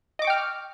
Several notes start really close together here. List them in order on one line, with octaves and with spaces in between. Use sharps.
D#5 D6 C#6 G5 F6